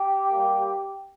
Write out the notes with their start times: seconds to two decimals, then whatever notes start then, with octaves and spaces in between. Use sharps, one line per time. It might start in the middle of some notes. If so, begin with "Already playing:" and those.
Already playing: G4
0.30 G3 A#3